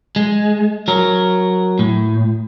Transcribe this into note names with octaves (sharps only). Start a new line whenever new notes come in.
G#3
F#3 A#4
A2